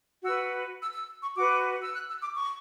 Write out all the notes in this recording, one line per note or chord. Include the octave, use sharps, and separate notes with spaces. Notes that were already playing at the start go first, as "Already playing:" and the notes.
F#4 B4 E6
E6
E6
C#6
F#4 B4 D6
E6
F#6
E6
D6
C#6